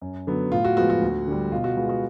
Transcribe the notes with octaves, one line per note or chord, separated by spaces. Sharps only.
F#2
D3 F#3 B3
A2 F4
F#4
F3 G#3 B3 F#4
F#4
D2
D3 G3
B2 F4
F#4
G#3 B3 F4
F#4